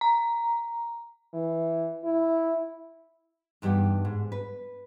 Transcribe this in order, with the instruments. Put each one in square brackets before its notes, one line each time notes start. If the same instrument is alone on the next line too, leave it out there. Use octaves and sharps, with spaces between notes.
[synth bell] A#5
[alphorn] E3
E4
[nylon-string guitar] E2 G2 D#4 G4 F#5
G#2
B4